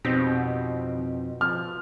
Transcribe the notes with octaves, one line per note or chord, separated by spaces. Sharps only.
F2 B2 C4 D#4 G4
F3 F6